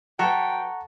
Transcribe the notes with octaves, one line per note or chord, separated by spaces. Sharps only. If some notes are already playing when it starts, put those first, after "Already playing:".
F#3 A4 B4 F#5 G5 A#5 C#6